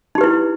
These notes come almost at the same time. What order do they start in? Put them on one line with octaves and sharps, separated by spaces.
D#4 G4 B4 E4